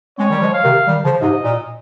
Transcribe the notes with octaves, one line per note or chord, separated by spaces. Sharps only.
G#3 C4 C#5
D#3 G3
F3 G#3
F5
C3 D#3
D#3 G3
C#3 F3
G#2 C3 D#5
A#2